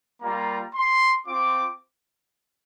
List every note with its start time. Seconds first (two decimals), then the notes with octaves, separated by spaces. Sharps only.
0.20 G3 A#3 F4 A#5
0.73 C6
1.25 C4 F4 D6